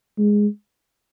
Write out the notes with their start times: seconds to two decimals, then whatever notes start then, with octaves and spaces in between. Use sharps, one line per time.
0.18 G#3